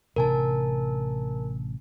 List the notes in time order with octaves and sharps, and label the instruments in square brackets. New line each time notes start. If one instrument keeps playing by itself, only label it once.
[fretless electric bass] A1 C3 D4 [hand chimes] A#4 G#5 A5